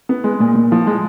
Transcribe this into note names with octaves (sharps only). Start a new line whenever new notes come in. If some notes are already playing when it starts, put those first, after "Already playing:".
B3
G#3
A#2
A#2
F3
G#3